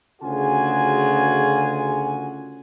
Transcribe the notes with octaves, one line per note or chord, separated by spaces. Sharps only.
D2 C#3 F4 F#4 G#4 G#5